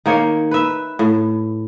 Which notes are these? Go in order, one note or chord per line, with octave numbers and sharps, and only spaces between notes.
D#3 A#3 C#5
B4 E5
A2